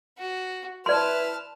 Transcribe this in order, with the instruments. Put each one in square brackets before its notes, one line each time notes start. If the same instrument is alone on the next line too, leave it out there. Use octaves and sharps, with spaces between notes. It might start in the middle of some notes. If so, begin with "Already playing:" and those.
[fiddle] F#4
[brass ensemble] E4 B4 [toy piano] D5 C6 [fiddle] A5 F6